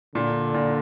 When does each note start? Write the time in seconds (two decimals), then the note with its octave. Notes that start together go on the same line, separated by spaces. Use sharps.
0.15 A#2 D3
0.54 A#2